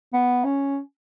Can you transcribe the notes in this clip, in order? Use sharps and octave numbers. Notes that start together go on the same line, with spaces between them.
B3
C#4